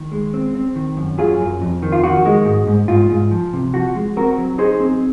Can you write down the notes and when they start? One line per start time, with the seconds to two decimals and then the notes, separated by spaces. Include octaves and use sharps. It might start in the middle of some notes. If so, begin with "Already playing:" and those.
Already playing: D#3
0.12 G#3
0.34 C4
0.55 C4
0.76 D#3
0.97 F#2
1.18 F#3 F4 G#4
1.40 F#2
1.62 F2
1.82 D#3
1.92 F4
2.04 D#3 F#4
2.25 G#3
2.46 G#2
2.67 G#2
2.88 G#2 F4
3.10 G#2
3.31 F3
3.53 C3
3.74 F3 F#4
3.95 G#3
4.16 C4 F#4 A#4
4.38 F#3
4.58 D#4 G#4 C5
4.80 C4